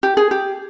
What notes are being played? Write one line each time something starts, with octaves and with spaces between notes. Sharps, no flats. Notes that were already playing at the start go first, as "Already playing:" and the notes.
G4
G#4
G4